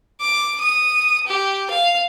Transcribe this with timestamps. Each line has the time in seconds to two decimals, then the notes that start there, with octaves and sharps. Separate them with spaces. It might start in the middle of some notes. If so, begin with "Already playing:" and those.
0.21 D6
0.61 D#6
1.27 G4
1.70 F5